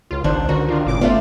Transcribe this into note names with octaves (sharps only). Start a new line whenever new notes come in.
C#2 F4
G#1 D#3 D4 C5
D3 F#4 A#4
D#3 D4 F4
G1 A2 C#3 D6
G#1 A3 B3 F4 D5